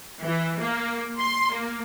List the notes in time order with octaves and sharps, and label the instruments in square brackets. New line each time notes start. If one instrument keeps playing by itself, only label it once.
[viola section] E3
A#3
C6
A#3